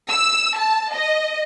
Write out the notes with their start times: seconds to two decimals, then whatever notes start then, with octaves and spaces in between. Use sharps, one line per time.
0.11 E6
0.59 A5
0.94 D#5